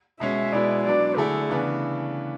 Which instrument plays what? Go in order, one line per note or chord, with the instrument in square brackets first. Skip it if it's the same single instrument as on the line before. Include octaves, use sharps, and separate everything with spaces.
[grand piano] B2 G#3 C#4 [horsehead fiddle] E5
[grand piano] B2 G#3 B3 E4 [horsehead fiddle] D5
[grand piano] F#3 B3 D4 [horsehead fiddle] D5
[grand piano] D3 A3 E4 [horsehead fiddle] G#4
[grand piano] C#3 E3 B3 D4